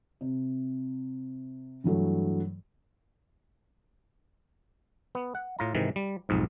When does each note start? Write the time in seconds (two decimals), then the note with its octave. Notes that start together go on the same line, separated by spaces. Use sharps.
0.21 C3
1.84 G2 E3 F#3 A3
5.15 B3
5.35 F#5
5.59 A2 F4 A#5
5.75 G#2 C3 D#3 E3
5.96 G3
6.29 B1 F2 G#2